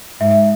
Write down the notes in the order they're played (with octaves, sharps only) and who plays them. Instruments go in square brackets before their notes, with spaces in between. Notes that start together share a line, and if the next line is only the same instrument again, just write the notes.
[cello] G#2 [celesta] E5
[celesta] E5